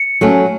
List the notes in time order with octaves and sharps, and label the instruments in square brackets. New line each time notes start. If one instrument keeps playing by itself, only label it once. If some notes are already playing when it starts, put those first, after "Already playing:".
Already playing: [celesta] C#7
[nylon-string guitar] F#3 A3 C#4